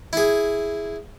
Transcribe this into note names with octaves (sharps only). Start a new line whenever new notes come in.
E4 G#4